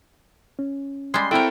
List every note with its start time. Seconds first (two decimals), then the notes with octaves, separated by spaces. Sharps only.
0.59 C#4
1.14 G3 G#3 C6
1.31 C4 E4 F#4 A4 A#4 G5